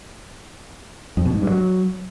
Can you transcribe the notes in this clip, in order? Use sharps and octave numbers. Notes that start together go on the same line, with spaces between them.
F2
B2
G#2
G2
F#3